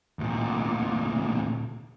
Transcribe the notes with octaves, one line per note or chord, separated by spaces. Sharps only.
D2 A#2